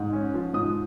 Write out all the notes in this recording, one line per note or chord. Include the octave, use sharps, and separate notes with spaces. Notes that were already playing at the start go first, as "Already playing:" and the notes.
Already playing: G#2
C#4
F3
G#2 D#6